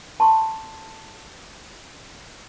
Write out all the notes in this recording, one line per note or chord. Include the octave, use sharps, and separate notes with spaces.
A5 C6 C#6